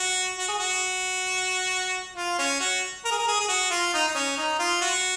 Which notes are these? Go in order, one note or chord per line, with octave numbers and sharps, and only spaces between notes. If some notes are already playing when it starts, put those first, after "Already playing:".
Already playing: F#4
F#4
G#4
F#4
F4
C#4
F#4
A#4
G#4
A#4
G#4
G#4
F#4
F4
D#4
D#4
C#4
D#4
F4
F#4